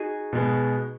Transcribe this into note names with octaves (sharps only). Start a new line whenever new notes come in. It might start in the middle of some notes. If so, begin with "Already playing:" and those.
Already playing: D#4 F#4 G#4
B2 G#3 B3